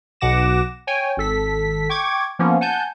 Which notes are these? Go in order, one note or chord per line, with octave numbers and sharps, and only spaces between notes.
B1 B2 F#5 D6 A#6 E7
C#5 G5 G#5
G#1 A4 B6
G5 C#6 D6 G#6
F3 A#3 B3 C#4
F#5 G#5 A5 G6